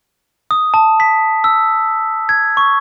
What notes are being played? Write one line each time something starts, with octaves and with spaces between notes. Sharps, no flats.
D#6
A5
B6
E6
G#6
C#6